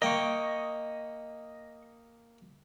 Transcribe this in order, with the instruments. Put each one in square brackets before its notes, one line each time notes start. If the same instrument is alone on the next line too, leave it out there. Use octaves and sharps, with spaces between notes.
[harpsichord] A#3 G5 [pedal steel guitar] D#5 C#6